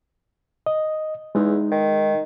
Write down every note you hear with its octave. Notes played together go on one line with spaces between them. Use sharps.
D#5
E2 G#3 D#4
D#3